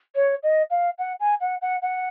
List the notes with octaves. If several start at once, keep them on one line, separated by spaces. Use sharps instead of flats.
C#5
D#5
F5
F#5
G#5
F#5
F#5
F#5